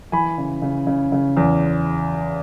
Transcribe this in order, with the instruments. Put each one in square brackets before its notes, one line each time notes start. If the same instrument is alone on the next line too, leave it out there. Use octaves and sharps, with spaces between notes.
[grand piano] E3 G#5 B5
C#3
C#3
C#3
C#3
E2